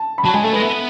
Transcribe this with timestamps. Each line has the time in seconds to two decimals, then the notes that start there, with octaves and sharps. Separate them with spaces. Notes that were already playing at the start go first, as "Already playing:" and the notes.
Already playing: A5
0.18 B5
0.24 F#3 A5
0.34 G#3 G#5
0.44 A3 A4
0.53 G#3 B4
0.62 B3 E5